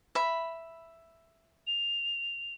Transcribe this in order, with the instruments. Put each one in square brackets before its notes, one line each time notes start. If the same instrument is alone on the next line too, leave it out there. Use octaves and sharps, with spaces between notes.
[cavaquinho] E5 B5
[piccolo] F7